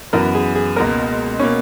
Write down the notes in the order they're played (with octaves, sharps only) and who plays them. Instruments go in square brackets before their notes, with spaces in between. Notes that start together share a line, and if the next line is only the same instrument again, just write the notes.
[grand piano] F#2 E3 B3 F#4 [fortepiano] A#4
[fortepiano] G#4
G#4
[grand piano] C#2 B2 A#3 [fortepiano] A#4
[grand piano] B2 A#3 [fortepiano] C#4